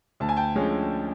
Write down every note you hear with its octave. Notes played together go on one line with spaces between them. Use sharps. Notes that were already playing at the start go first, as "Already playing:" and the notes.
D2 A5
G#5
G5 A5
D3 F3 G#3 C#4